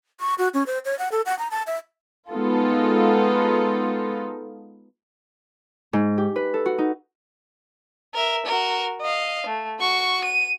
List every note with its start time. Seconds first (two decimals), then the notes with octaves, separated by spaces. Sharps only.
0.20 C#6
0.38 F#4
0.54 C#4
0.67 C5
0.85 C#5
0.99 F#5
1.12 A4
1.26 F#5
1.39 A#5
1.51 A5
1.67 E5
2.31 G#3 B3 D#4 F4 A4
5.93 G#2
6.18 G4
6.36 B4
6.54 A4
6.66 F#4
6.78 D#4
8.15 A#4 E5
8.46 F#4 A#4
9.02 D#5 F5
9.47 A3
9.80 F#4 C#6
10.24 D#7